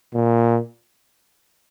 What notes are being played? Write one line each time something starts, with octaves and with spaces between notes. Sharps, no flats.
A#2